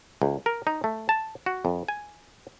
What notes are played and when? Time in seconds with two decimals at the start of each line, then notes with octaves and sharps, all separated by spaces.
0.22 C#2
0.46 A#4
0.67 D#4
0.84 A3
1.09 A5
1.46 F#4
1.65 F2
1.88 G#5